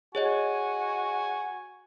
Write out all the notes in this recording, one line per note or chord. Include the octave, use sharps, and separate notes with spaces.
F#4 G#4 C#5 D#5 G#5